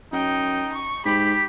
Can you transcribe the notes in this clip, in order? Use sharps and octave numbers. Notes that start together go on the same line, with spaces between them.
F#2 D#4 G5
C#6
G#2 G4 B5 B6